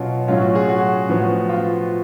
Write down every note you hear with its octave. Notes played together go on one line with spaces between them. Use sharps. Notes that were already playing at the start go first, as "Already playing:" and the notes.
Already playing: B2 F#3 C#4 F4
A2 F#3 C#4 F4
F#4
F4 G#4
F#4
A2 F3 B3
F4